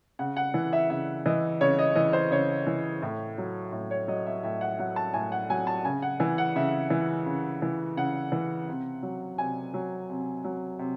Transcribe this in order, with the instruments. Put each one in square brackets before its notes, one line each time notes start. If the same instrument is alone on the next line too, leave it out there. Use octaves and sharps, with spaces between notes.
[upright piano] C#3 F#5
F#5
E3
E5
C#3 E5
E3 D#5
C#3 C#5
D#5
E3 D#5
C5
C#3 C#5
E3
A2
F#3
A2
C#5
F#3 D#5
E5
A2 E5
F#5
F#3 F#5
A5
A2 G#5
F#5
F#3 G#5
A5
C#3 G#5
F#5
E3 G#5
F#5
C#3 E5
E3
C#3
E3
C#3 F#5
E3
C3
F#3
C3 G#5
F#3
C3
F#3
C3